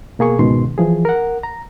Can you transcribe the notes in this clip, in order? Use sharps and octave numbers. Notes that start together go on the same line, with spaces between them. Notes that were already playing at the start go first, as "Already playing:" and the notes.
B2 A#3 G#4 C#6
C#2 G#2 B2 D#3 C6
E3 F3 G#4
A#4 F#5
A#5